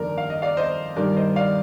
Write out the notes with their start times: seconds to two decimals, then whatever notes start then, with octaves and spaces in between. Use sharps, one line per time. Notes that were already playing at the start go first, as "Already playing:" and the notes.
Already playing: G1 F2 D#3 A#3 A#4 D5
0.18 F5
0.30 D#5
0.42 D5 F5
0.57 C5 D#5
0.96 G2 D#3 G3 A#4 D5
1.16 C5 D#5
1.36 D5 F5